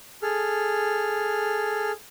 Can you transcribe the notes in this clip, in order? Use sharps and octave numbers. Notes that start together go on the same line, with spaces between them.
G#4 A4 F6